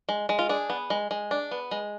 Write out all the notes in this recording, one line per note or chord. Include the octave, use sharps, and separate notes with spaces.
G#3
G#3
F4
D4 G#4
B3
G#3
G#3
D4
B3
G#3